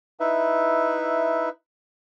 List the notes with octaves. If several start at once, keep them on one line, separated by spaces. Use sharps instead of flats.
D#4 E4 B4 E5